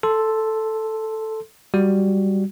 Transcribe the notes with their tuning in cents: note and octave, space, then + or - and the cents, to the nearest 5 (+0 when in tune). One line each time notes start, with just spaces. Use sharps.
A4 +0 C6 +0
G3 +0 F#4 +0